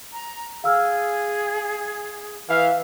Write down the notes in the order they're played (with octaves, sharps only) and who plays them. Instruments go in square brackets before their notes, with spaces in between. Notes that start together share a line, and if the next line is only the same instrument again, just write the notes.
[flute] A#5
[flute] G#4 [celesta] F5 E6 F6
[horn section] E3 E5 F5